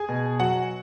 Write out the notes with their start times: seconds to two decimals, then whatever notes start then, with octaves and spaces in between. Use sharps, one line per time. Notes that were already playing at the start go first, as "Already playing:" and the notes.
Already playing: G#4 G#5
0.09 B2
0.40 F#3 F#4 F#5